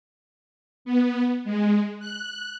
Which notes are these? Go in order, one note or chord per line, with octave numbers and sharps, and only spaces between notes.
B3
G#3
F#6